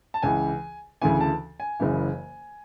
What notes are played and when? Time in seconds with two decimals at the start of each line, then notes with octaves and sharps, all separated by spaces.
0.14 A5
0.22 C#2 C#3 E3 G#5
1.02 D2 C#3 E3 G#5
1.21 A5
1.60 G#5
1.80 F#1 F#2 C#3 E3